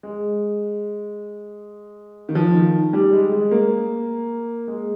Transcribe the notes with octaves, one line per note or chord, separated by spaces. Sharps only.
G#3
D#3
F3
D#3
G3
G#3
G#3
A#3
G#3